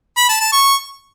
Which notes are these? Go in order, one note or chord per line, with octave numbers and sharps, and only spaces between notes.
B5
A5
A5
C#6